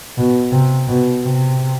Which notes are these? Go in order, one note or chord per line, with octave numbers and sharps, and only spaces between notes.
B2
C3
B2
C3